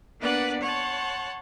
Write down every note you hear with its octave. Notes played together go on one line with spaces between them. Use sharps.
A#3 B3 D4 B4 D5 F#5
C#5 F#5 A5 C6